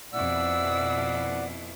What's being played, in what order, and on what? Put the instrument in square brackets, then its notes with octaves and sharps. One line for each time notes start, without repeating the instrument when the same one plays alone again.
[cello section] F2 B2 E4 [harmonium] D5 F#5 [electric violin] E6